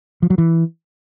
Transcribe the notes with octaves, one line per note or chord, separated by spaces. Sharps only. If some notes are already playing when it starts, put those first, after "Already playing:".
F3
F#3
E3